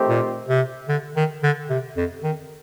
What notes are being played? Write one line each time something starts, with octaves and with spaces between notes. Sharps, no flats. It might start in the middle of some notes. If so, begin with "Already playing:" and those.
Already playing: D#3 A3 C4 G4 C5
A#2
C3
D3
D#3
D3
C3
F2
D#3